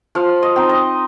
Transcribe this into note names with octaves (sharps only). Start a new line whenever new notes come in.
F3 F5
D#5
C4 D#4
D#5